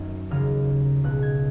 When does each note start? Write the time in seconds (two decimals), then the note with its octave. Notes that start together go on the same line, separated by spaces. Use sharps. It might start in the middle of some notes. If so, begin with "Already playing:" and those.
Already playing: F#2 D#3
0.31 D#2 C#3 F6
1.04 C#2 B2 F#6
1.23 G#6